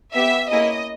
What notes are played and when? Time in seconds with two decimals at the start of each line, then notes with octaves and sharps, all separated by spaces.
0.15 B3 G4 E5
0.50 A#3 C#4 E4 G#4 D#5